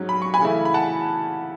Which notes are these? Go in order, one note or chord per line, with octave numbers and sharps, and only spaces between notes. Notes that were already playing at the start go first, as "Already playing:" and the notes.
Already playing: G#2 F#3 C#4
B5
C#6
G#5 B5
C#3 E3 A3 E4
B5
F#5 A5